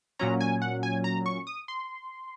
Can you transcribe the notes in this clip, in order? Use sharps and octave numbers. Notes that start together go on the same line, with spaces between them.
A#2 F#3 C#4 A#5
G#5
F#5
G#5
A#5
C#6
D#6
C6